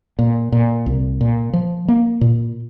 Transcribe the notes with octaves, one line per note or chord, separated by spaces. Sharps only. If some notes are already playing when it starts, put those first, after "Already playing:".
A#2
A#2
C2
A#2
F3
A#3
A#2